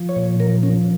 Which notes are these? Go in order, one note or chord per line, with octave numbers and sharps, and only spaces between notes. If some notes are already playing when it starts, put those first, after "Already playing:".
Already playing: F3
C#5
A#2
F3 A#4
F3 C#4